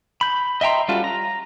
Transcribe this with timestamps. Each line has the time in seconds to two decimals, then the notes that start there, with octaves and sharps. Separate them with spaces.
0.21 B5 G6
0.61 D#5 E5 G5 A#5 C6
0.88 G3 C#4 F4 F#4 A4
1.04 A#5